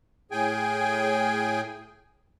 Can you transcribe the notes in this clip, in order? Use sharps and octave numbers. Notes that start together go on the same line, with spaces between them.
A2 G#4 G5 G#5